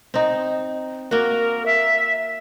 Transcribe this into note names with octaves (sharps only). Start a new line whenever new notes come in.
C4 D#4
A#3 F#4 A#4
E5